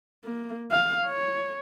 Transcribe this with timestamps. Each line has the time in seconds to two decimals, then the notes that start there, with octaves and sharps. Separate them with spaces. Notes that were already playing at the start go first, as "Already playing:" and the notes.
0.25 A#3
0.71 F5
1.05 C#5